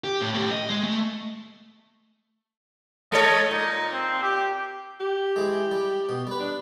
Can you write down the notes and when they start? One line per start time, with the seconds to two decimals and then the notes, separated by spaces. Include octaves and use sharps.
0.04 G4
0.21 A2
0.34 A2 G4
0.51 D#5
0.69 G#3
0.83 A3
3.12 G#3 A4 C#5 D#5
3.51 A#2 D#4
3.92 C4
4.22 G4
5.00 G4
5.36 E3 G#3
5.71 G3
6.09 B2
6.27 G3 B4
6.40 D4